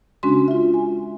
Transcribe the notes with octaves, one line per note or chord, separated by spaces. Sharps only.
C#3 G#3 C#4 D4 F#4 C6
F4 E5
G#5